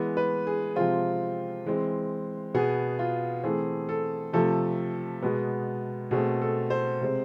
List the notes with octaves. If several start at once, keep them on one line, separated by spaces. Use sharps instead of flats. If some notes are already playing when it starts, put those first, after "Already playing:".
Already playing: E3 G#3 B3
B4
G#4
C3 F3 G#3 C4 F4
E3 G#3 C4
B2 B3 G#4
F4
E3 A3 C4 G#4
A4
C3 F3 A3 A4
B2 G#3 B3
B2 A3 C4 G#4
A4
C5
C3 G#3 C4